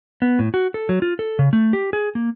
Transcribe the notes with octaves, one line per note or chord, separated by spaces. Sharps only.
B3
A2
F#4
A4
F#3
F4
A4
C#3
A3
G4
G#4
A#3